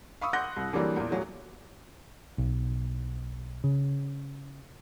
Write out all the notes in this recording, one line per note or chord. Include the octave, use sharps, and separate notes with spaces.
F5 B5 C#6 D#6 E6
F#5 C6 D6 F#6 G6 A#6
C2
D3 E3 F#3 G3 A#3
E2 A#2
D#1 F#3 A3
B1
C#3